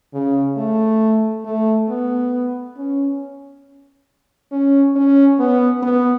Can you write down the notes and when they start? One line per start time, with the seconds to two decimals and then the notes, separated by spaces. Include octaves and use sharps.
0.14 C#3
0.58 A3
1.45 A3
1.89 B3
2.77 C#4
4.52 C#4
4.95 C#4
5.39 B3
5.83 B3